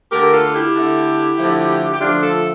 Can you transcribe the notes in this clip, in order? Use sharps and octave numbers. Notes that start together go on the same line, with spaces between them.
D3 A3 G4 A#4
F4 A4
E4 G4
D3 A3
D3 F3 A3
G4
D3 F3 A3 D4 F4
F4 A4